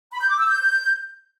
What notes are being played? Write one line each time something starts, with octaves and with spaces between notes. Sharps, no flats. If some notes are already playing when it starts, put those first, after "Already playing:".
B5
G6
D6
E6
G6